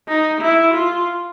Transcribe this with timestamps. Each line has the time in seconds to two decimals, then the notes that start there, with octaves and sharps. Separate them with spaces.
0.08 D#4
0.42 E4
0.75 F4